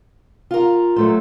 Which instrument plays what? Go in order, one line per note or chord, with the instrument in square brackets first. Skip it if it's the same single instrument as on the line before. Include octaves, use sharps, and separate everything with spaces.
[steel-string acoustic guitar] F4 A#4
[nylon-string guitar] F#3 A3 C5